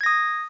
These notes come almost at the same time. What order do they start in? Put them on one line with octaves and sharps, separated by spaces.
G#6 A#6 D#6